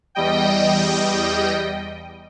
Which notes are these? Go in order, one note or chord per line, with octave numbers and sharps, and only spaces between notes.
E2 G3 D#5 G5